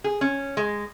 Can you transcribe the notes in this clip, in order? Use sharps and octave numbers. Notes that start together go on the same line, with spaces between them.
G#4
C#4
G#3